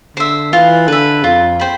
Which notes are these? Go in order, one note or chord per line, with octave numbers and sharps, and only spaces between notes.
D3 C5 E5
E3 F4
D3 B4 E5
F2 F4
C5 G5 B5